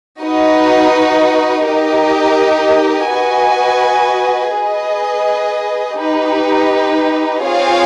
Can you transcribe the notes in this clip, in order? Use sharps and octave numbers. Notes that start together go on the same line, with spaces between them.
D#4 F#4 B4 D#5
D#4 G4 A#4 D#5
F#4 B4 D#5 G#5
G#4 B4 D#5
D#4 G4 B4
C4 F4 G#4 C#5 F5